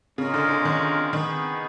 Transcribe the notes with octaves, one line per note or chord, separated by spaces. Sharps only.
C#3 G#3 C#4 F4 A#4 D#5
D3
D3
D#3
D#3 B3 D#4 G#4